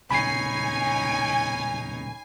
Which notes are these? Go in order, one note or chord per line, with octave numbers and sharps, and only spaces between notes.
E1 A#2 C#3 C#4 D#4 G#5 B5 C7